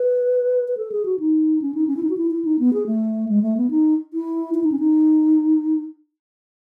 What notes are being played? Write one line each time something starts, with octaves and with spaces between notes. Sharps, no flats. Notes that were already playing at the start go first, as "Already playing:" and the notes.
Already playing: B4
B4
A4
G#4
F#4
D#4
C#4
D#4
C#4
E4
D#4
F#4
E4
E4
D#4
B3
G#4
A3
G#3
A3
B3
D#4
E4
E4
D#4
C#4
D#4